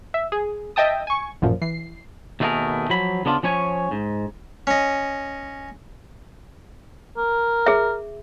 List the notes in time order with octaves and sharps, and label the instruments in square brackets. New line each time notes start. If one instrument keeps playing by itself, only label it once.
[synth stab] E5
G#4
D#5 E5 G5 A5 D#6
G#5 C#6
A1 F#2 A#2 F3
E3 C7
[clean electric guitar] D#2 B2 A3 D4 G#4 A#4
F3 F#3 B5
C#3 B3 D4 F4
F3 C#4 C#5 G#5
G#2
[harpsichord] C#4 D#5
[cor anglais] A#4
[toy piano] G#4 E5